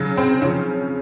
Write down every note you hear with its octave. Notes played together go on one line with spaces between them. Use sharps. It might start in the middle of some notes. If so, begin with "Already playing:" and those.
Already playing: C#3 F#3
C4
C#3 F3 C#4